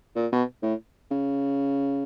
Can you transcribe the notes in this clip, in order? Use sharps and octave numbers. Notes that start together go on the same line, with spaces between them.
A#2
B2
A2
C#3